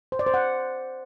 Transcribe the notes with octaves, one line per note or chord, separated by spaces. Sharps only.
C5
D5
C5
F#5